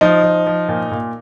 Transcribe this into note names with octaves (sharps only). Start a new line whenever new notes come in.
F3 D#4
F3
F3
A#2
A#2